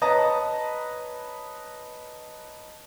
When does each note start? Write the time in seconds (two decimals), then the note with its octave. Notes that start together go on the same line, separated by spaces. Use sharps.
0.02 B4 C#5 D#5 A5 A#5 D#6